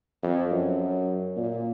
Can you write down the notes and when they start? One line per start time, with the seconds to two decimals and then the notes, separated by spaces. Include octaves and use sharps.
0.23 F2
0.52 F#2
1.37 A#2